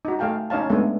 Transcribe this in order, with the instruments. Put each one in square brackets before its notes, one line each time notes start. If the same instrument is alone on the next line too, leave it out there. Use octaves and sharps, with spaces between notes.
[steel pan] D#4 F#4
A3 G#4 F5 G5 A5
C#4 D#4 C#5 F5 A5
G#3 A3 B3 D4 E5 G#5